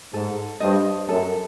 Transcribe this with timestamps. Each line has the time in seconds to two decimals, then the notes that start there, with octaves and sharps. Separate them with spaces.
0.13 G#2 A4
0.60 G2 C5 D#5
1.09 F#2 A4